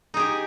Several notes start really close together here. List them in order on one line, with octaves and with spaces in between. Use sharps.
D#4 G#4 G4